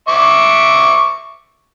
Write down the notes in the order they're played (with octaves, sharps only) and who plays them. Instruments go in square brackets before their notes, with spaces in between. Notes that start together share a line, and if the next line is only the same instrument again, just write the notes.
[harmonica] E5 C#6 D6